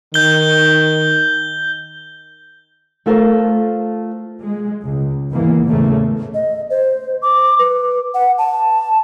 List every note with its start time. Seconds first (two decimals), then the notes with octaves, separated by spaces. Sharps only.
0.14 D#3 G6 G7
3.06 A3 F4 A4 A#4 C5 F5
4.41 G#3
4.84 C#2
5.30 D#2 G#2 E3 A#3 B3
5.64 A1 E2 C#3 A3 A#3
6.34 D#5
6.70 C5
7.22 D6
7.59 B4
8.14 F#5
8.38 A5